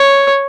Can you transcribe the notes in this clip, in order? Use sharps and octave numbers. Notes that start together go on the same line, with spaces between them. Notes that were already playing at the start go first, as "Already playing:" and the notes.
Already playing: C#5